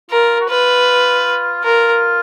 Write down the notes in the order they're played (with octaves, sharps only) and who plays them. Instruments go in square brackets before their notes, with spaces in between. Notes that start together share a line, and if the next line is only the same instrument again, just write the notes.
[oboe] F4 [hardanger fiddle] A#4
[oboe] F#4
[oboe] F4 [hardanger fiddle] B4
[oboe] F4 [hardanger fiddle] A#4